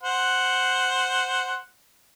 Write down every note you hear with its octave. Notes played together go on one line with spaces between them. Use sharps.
C5 F#5